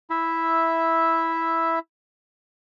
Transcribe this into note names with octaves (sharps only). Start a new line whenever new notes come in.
E4 E5